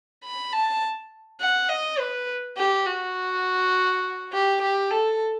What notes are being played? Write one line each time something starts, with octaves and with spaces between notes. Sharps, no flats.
B5
A5
F#5
D#5
B4
G4
F#4
G4
G4
A4